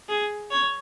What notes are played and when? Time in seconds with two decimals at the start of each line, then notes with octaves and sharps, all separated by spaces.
0.09 G#4
0.51 C#5